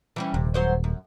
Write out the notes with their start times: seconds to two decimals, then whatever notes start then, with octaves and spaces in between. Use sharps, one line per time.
0.16 E3 G3 C#4
0.34 D#1 C3
0.54 F#3 C5 C#5
0.84 F#2